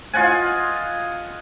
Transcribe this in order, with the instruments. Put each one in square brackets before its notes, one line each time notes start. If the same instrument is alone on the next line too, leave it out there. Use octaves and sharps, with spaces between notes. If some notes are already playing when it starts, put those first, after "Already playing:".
[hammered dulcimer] F4 D#5 F#5 G#5